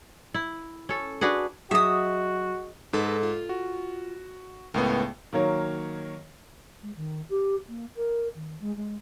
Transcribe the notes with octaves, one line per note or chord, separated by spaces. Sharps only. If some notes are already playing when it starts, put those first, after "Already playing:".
E4
C#4 A4
D4 F#4 G#4 B4
F#3 F#4 G#4 D#5 E5 D#6
G#2 D#4 A4 B4
F4
F#4
C#2 A2 B3 A#4
D#3 F#3 A#3 A#4 C#5
G#3
D#3
G4
A#3
A#4
D#3
G#3
G#3